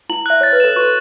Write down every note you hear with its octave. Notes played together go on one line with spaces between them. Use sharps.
E4 F#7
E5 F#6
C#5 A6
B4
A4 E7
F#4 C#6